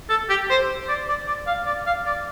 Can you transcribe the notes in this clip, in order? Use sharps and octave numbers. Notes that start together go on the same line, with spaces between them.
A4
G4
C5
D5
D5
D5
F5
D5
F5
D5